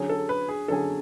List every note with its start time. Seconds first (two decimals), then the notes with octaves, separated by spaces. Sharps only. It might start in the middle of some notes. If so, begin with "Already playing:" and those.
Already playing: D3 F#3 C#4 G#4
0.09 A4
0.29 B4
0.48 G#4
0.68 D3 F#3 C#4 G#4 A4